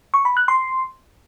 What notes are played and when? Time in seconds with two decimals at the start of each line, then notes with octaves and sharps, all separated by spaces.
0.14 C#6
0.25 B5
0.37 F#6
0.48 C6